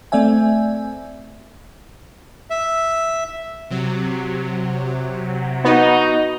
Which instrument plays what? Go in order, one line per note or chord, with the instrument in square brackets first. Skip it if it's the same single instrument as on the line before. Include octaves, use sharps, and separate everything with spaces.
[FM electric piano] A3 C4 D5 E5 G#5
[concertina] E5
[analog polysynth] C3 F#3
[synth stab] B3 [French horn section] D#4 [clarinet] F#4